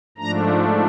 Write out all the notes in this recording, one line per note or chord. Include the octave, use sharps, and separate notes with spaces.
G#2 F3 A3 D4 A#5